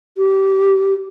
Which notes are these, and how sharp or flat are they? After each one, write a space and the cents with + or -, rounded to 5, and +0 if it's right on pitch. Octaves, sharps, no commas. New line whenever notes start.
G4 -20